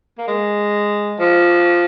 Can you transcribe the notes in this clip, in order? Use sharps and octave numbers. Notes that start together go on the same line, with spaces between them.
A#3
G#3
F3